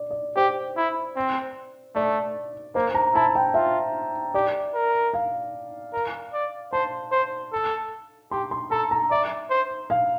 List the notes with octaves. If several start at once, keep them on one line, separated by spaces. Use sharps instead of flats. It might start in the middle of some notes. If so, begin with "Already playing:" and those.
Already playing: D5
D5
G4 C5
E4
C4
A3 D5
A#3 C5
A#5
E4 A5
G5
F4 E5
G4 D5
A#4
F5
A#4
D5
C5 A5
C5
A4
G4 C6
C6
A4 A#5
A#5
D5 E5
C5
F5